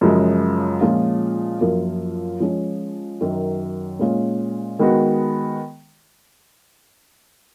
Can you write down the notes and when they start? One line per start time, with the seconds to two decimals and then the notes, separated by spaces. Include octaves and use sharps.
0.01 F#2 C#3 F3 G#3
0.81 A#2 F3 G#3 C#4 F4
1.61 F#2 F3 A#3 F4
2.40 F3 G#3 C#4
3.21 F#2 D#3 F#3
3.99 A#2 G#3 C#4 F4
4.79 D#3 G#3 B3 F#4